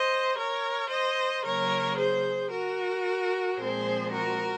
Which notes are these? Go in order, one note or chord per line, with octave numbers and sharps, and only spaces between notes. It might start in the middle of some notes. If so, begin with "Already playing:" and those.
Already playing: C5 D#5
A#4 C#5
C5 D#5
C#3 F#3 A#3 A#4 C#5
G#4 C5
F#4 A#4
A#2 F3 G#3 C4 G#4 C5
F#4 A#4